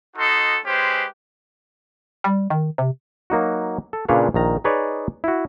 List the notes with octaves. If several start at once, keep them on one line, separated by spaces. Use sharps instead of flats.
D#4 F#4 A4 D#5 C6
G#3 C#4 G4 B4 C5
G3
D#3
C3
F#3 A#3 D#4 F#4
A4
A#2 C#3 D4 B4 C#5 F5
A#1 D#3 A#5
D#4 G#4 B4 C#5 D5
E4 F#4